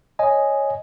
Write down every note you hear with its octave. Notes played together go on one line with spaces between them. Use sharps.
C#5 D#5 G#5